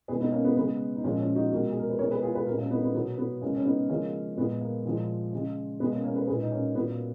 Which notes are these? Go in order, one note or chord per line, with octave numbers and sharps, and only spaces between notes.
B2 G#3 G#4 B4
B3 D#4
A#3 C#4
B3
C#3 G#3 B3
D#4
A#2 F3 G#3 A#3 C#4
C#4 F4
D#4 F#4
B2 G#3 F#4 A#4
G#4
A#4
B4
B2 G#3 A#4 C#5
G#4 B4
F4 G#4
G#4 B4
A#2 G#3 F#4 A#4
A#3 C#4
B3 D#4
B3
B2 F#3 B3
B3
C#3 G#3 A#3 C#4
C#4
B3 D#4
C#3 F3 G#3 A#3 C#4
A#2 G#3 B3
A#3
A#2 F3 G#3
C#3 G#3
B2 G#3 B3
A#3 C#4
A#3 C#4
G#4 B4
A#2 G#3 G#4 B4
D#4
A#3 C#4
A#2 F#3 B3
A#3